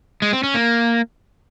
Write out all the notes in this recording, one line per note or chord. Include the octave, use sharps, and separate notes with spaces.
G#3
C4
C#4
A#3